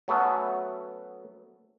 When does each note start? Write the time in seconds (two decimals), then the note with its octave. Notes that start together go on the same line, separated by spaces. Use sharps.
0.08 F#3 A3 B3 C#4 F#4